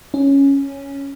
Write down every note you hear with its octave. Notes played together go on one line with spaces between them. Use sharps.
C#4